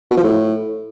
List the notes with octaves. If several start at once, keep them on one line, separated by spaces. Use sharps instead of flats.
B2
F3
A2